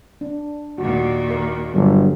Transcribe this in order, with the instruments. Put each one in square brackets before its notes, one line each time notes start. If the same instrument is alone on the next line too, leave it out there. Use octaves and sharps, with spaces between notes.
[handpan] D4
[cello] D#2 A#2 [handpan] F#4
[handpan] A#4
[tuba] G1 [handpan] F#3